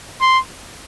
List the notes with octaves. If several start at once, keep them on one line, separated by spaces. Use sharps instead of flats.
C6